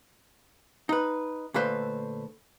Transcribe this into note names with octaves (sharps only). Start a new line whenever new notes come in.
D#4 B4
A#2 D3 A3 B4 C5